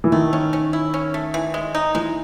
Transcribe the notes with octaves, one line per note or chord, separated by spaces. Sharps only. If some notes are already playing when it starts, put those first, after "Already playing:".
E3
D#3 A3
C#4
C#4
E4
C#4
A3
E3
G#3
D#4
E3 G#3